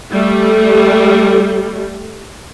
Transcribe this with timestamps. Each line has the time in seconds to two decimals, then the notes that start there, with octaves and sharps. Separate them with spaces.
0.11 G3 A3